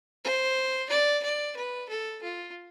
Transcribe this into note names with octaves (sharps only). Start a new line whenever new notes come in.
C5
D5
D5
B4
A4
F4